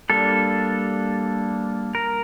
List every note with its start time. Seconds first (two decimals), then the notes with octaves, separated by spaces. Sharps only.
0.10 G3 A#3 D4 A4
1.95 A#4